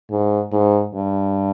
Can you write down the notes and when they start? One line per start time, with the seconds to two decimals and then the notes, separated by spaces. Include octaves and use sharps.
0.11 G#2
0.52 G#2
0.94 G2